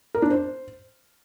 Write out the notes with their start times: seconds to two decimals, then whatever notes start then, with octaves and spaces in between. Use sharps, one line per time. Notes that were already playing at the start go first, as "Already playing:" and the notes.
0.15 A#4
0.22 D4
0.30 C5